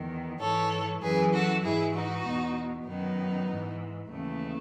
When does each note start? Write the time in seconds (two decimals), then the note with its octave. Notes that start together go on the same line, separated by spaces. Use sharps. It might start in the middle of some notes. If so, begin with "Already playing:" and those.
Already playing: E2 D#3
0.40 G#2 E3 A4 C#5
1.02 F#2 E3 G#4 B4
1.33 F#4 A4
1.63 G#2 E3 E4 G#4
1.95 D#4 F#4
2.25 E2 B2
2.87 F#2 D#3 B3 D#4
3.49 G#2 E3
4.10 D#2 C#3 E3 A3